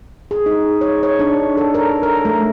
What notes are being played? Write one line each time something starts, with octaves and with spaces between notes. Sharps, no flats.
G#4
D#4
C#5
C#5
D4
A4
A#4
A#4
A3